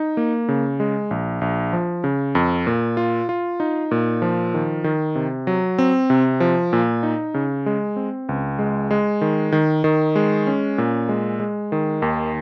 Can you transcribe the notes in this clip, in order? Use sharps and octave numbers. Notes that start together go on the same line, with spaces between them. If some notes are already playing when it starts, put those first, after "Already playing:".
Already playing: D#4
A#3
C#3
G#3
A#1
A#1
F3
C#3
F2
A#2
F4
F4
D#4
A#2
F3
D#3
D#3
C3
F#3
C4
C3
F3
A#2
D#4
C#3
G#3
C4
C#2
G#3
G#3
D#3
D#3
D#3
G#3
C#4
A#2
G#3
G#3
D#3
D#2